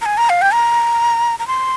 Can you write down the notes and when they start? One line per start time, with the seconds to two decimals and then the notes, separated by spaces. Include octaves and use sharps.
0.02 A#5
0.06 G#5
0.18 A#5
0.30 F5
0.42 G5
0.53 A#5
1.39 A#5
1.48 C6